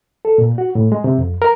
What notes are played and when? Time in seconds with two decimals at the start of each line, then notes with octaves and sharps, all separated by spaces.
0.25 A4
0.38 A#2
0.58 F#4
0.75 A2
0.92 G#3
1.04 C3
1.18 F2
1.42 A#4